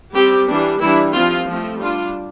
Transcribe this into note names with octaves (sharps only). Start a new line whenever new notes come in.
G3 C4 G4
E3 G3 D4
E3 G3 D4 E4
F3 C4 F4
F3 A3 C4
G3 D4 F4